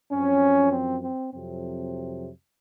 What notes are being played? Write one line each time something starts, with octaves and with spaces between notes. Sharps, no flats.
F#2 F3 C4 C#4
C4
C4
F2 C3 F#3 C4